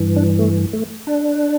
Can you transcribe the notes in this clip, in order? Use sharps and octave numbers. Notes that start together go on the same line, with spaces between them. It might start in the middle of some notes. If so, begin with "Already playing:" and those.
Already playing: G2 E3
D4
A3
A3
D4